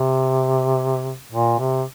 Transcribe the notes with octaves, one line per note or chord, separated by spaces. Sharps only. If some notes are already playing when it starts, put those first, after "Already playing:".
Already playing: C3
A#2
C3